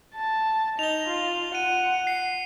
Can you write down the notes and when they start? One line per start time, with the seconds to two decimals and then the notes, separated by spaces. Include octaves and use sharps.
0.16 A5
0.79 D#4 F7 G7
1.08 F4
1.55 F#5 D#7
2.07 C7